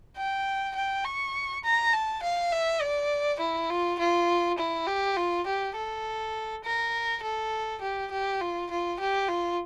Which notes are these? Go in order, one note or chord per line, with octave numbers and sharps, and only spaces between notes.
G5
G5
C#6
A#5
A5
F5
E5
D5
E4
F4
F4
E4
G4
F4
G4
A4
A#4
A4
G4
G4
F4
F4
G4
F4